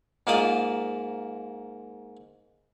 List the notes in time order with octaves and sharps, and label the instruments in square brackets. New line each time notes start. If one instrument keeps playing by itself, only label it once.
[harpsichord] G#2 A#3 F4 C5 D5 D#6